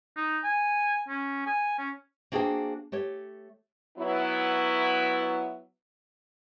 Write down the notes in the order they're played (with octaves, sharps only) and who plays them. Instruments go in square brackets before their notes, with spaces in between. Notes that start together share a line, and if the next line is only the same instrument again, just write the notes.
[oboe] D#4
G#5
C#4
G#5
C#4
[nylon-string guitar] A#3 D4 F#4 G#4 C5 G5
A3 G4 C#5
[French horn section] F#3 B3 E4